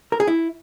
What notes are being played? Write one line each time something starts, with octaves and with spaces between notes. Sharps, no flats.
A#4
G#4
E4